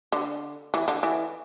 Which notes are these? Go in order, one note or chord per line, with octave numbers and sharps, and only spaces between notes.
D3
E3
D3
E3